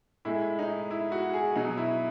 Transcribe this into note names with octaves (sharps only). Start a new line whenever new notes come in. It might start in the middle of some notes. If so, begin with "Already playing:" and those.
A2 G#3 E4
D#4
E4
F#4
G#4
B2 F#3 D#4
E4